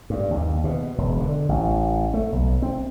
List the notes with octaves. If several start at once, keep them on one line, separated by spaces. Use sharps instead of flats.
G2
D#2
B2
E1
D3
A1
A3
B1
C4